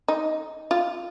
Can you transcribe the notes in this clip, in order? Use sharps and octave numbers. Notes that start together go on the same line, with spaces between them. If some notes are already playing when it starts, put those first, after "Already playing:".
D#4
F4